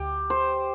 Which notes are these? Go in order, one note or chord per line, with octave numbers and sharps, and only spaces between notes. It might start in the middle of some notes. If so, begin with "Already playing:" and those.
Already playing: D2 G4
C5